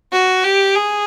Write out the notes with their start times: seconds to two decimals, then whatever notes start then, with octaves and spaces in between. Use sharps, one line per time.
0.13 F#4
0.44 G4
0.75 G#4